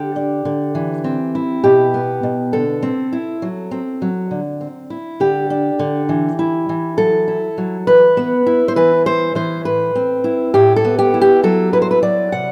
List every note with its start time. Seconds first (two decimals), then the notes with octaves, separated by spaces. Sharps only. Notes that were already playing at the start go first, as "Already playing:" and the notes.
Already playing: D3 G4
0.16 D4
0.45 D3
0.75 E3
1.04 C4
1.35 E4
1.64 B2 G4
1.94 B3
2.23 B2
2.53 D3 A4
2.83 C4
3.13 E4
3.42 F#3
3.71 C4
4.02 F#3
4.31 D3
4.61 C4
4.90 E4
5.20 D3 G4
5.50 D4
5.79 D3
6.09 E3
6.39 E4
6.69 E3
6.98 F#3 A4
7.28 E4
7.58 F#3
7.87 E3 B4
8.17 B3
8.46 E4
8.68 C5
8.76 E3 B4
9.06 E4 C5
9.35 E3 C5
9.65 A2 B4
9.95 C4
10.24 E4
10.54 A2 G4
10.76 A4
10.84 B3
10.99 G4
11.14 E4
11.21 G4
11.43 F#3 A4
11.73 E4 B4
11.82 C5
11.91 B4
12.03 F#3 D5
12.32 C3 F#5